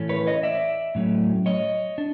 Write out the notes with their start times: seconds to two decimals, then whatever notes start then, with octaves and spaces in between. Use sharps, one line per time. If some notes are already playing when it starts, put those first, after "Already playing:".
Already playing: A2 E3 A3 C#4
0.09 B4 C#5
0.26 C#5 D#5
0.43 D5 E5
0.95 A2 F#3 A3 C#4
1.46 C#5 D#5
1.98 D4